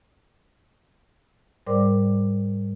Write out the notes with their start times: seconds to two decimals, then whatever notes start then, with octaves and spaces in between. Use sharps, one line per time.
1.67 G#2 G3 A#4 C5 D5 D6